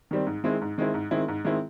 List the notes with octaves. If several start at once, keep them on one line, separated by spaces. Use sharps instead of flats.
D#3 G3 C4
G#2
D#3 G#3 C4 E4
G#2
D#3 G#3 C4 E4
G#2
D#3 G#3 C4 E4
G#2
D#3 G#3 C4 E4